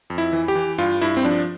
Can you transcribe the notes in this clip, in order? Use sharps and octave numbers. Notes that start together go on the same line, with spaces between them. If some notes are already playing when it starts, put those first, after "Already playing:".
F2
E4
E3
G4
E3
G2 F4
G2 E4
C4
F3 D4